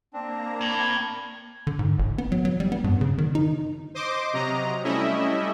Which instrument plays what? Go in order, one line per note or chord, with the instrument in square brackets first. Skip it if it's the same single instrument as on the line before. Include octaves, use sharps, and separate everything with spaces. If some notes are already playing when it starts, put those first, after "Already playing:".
[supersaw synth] A#3 A#5 [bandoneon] C4 D4
[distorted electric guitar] A5 B5 [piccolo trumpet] G#6
[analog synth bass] D3
G#2
G1
B3
F#3
F#3
G3
B3
G2
C#3
D#3
D#4
[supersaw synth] C5 D#5 C6 D6
C3 F#3 D#5 A#5
G3 A3 C#4 E4 D#5 E5